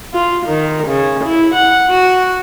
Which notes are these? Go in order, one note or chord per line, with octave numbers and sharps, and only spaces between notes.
F4
D#3
C#3
E4
F#5
F#4